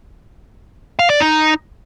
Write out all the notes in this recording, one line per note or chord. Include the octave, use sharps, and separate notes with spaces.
F5
D5
D#4